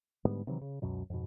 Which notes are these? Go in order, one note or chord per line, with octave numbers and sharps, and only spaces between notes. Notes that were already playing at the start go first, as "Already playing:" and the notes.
G#2 D3 G3 B3
C3 D#3 E3 F#3
C#3
C#2 F#2 B2 F#3
F2 G#2 B2